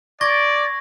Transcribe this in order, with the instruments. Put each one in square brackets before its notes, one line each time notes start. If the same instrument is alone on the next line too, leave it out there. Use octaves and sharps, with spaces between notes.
[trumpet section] D5 [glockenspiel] C#6 G#6 A#6